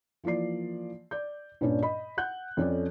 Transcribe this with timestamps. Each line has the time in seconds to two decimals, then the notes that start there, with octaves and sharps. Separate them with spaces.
0.24 E3 F3 A#3 D5 C7
1.11 D5 G6
1.61 G2 A#2 C#4 D4
1.82 D#5 B5
2.17 F#5 F#6 G6
2.57 F2 C#4 A4 D5